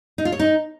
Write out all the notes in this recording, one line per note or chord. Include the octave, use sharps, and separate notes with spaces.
D#4
F4
C#5
D#4